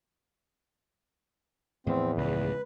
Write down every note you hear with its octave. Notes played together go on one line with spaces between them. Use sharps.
E2 A2 F3 A3 C4
C#2 C#3 B4